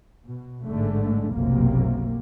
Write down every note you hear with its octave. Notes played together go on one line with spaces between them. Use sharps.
B2
A1 G#2 D3 G#3 A3
F1 B1 F#2 C3 A#3